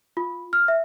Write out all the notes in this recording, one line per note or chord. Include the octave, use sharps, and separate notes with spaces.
F4
F6
E5